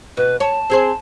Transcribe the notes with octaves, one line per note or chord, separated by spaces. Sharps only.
B2 B4
C#5 A5
C4 G#4 C5